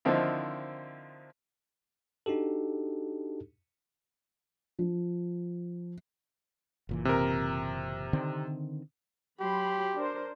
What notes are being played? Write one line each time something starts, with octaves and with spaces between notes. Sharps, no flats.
D3 D#3 F3 C4 D#4 E4
D4 D#4 F#4 G4 A4
F3
F#1 A#2 E3
C3 A#4
D3 D#3 C4
F#3 G4 B5 C6
D4 A#4 C5